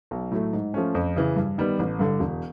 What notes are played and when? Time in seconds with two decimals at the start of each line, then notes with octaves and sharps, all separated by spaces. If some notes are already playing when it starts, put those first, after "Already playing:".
0.11 B1
0.31 A2 F#3 A3
0.53 G#2
0.74 F3 A3 C#4
0.95 F2
1.16 C#3 E3
1.36 G2
1.58 D#3 G3 B3
1.79 A1
1.99 G2 D3
2.20 E1